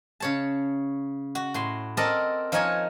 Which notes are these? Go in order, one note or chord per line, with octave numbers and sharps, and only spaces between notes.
C#3 C#5 A5
F#4
A2 C6
C4 A4 A#4 D5 D#5 A5
F3 D#4 A#4 C#5 G#5